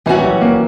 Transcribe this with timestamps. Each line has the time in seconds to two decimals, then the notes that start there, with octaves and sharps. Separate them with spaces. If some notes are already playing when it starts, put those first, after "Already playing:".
0.06 A#2 E3 G3 C#4 F#4
0.19 E3
0.24 F#3
0.41 A#3